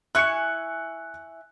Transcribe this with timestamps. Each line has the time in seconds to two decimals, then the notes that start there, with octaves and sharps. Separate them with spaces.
0.15 E4 G#5 C#6 F#6 C#7